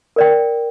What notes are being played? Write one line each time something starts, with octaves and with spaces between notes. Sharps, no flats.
A#4 D5 G5